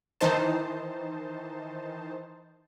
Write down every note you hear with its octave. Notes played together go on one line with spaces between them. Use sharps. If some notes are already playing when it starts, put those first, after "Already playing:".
D#3 E3 D#4 C5 A5